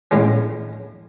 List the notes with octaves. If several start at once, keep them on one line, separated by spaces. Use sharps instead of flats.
A2 D3 G#3 C#4